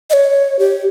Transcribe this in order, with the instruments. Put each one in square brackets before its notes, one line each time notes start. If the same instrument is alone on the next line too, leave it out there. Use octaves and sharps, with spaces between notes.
[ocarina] D#5
C#5
G4